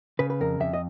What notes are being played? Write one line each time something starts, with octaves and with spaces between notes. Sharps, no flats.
C#3 B4
B4
F2 A#4
F2 E5
D#5